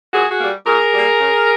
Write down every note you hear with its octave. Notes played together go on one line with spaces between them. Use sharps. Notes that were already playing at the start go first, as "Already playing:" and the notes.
A#2 F#4 G#4
F#4 G#4
G3 A#3
A#2 G#4 A#4
G3 A#3
C#3